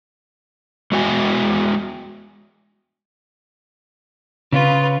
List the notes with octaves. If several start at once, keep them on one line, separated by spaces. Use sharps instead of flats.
G#3 B3 F#4 D#5 G5 G#5
C#3 C#4 F4 B4